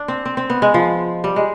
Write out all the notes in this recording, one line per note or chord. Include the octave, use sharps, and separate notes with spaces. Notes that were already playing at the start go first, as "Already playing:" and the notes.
Already playing: D4
C4
C4
C4
B3
G#3
F3
G3
G#3